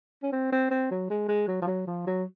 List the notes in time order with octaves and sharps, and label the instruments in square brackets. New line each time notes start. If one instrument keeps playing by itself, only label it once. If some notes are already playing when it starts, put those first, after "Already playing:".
[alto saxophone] C#4
C4
C4
C4
F#3
G#3
G#3
F#3
F3
F#3
F3
F#3